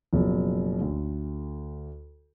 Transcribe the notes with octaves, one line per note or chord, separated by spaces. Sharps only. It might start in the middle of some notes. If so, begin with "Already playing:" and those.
F#1 B2 F3
D2